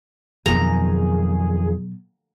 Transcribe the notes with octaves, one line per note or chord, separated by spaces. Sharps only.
F2 B2 D#3 F#3 G#4 A#5